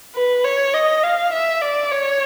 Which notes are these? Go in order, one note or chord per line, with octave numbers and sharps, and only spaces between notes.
B4
C#5
D#5
F5
E5
D5
C#5